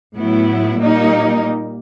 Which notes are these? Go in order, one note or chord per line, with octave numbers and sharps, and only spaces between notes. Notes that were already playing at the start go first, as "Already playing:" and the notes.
A2 F#3 B3 E4
A#2 G3 A#3 D#4